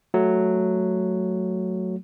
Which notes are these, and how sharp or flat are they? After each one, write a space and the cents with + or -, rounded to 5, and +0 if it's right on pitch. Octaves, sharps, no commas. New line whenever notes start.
F#3 +0 A3 +0